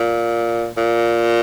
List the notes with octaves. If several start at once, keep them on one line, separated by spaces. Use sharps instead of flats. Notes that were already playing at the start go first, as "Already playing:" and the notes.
Already playing: A#2
A#2